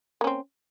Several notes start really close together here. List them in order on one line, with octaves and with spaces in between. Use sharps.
A#3 C#4 C4